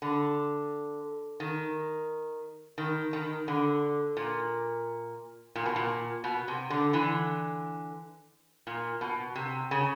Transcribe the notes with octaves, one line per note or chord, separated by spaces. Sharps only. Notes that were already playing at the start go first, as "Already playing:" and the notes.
D3
D#3
D#3
D#3
D3
A#2
A#2
B2
A#2
B2
C3
D3
D3 E3
A#2
B2
C3
C#3